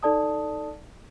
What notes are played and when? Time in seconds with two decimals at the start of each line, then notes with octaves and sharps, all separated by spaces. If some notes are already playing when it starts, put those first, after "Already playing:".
0.03 D#4 A4 D5 A5 D#6